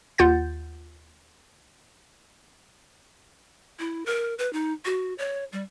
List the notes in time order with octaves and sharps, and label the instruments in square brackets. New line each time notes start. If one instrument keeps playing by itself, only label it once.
[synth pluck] D#2 F4 F#5 G6 A6
[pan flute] E4
A#4
B4
D#4
F#4
C#5
G3